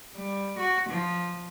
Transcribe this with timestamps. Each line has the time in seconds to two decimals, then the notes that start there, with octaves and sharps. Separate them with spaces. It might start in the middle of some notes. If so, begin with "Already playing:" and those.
0.16 G3
0.59 F#4
0.89 F3